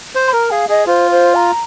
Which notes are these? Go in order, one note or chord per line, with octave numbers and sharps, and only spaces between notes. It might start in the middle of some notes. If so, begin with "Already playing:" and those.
C5
C6
A#4 A#5
G#4 F5
G#4 D#5
F4 C5
C5
A#5